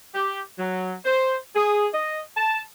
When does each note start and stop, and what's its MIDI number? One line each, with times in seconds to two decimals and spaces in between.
0.14 0.41 67
0.58 0.94 54
1.05 1.36 72
1.55 1.87 68
1.93 2.21 75
2.37 2.61 81